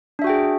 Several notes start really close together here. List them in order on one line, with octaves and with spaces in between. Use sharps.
D4 E5 F#4 G5 G#4